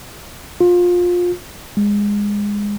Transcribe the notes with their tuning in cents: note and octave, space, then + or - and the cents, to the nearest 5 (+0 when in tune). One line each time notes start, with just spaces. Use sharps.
F4 +25
G#3 -15